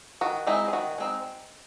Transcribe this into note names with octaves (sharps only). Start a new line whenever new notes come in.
D#3 F#4
G#3 C4 D#4 E4
G#4
D#3 F#4
G#3 C4 D#4